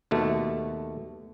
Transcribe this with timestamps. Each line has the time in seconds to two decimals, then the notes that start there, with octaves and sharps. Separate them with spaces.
0.11 D#2 B2 A3